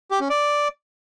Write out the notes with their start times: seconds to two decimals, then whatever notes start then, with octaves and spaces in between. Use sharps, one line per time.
0.11 G4
0.20 C#4
0.30 D5